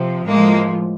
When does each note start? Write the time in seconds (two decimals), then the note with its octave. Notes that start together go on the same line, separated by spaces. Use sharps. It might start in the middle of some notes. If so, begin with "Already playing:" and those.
Already playing: C3 F3
0.26 A2 F3 G#3 A#3